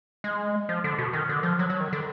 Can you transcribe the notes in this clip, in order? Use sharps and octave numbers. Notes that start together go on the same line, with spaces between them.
G#3
F3
D3
B2
D#3
D3
F3
F#3
F#3
D#3
D3